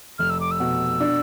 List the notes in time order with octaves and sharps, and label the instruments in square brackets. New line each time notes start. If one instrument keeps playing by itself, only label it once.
[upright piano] F1 [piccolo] F6
[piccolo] E6
D6
E6
[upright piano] B2
D4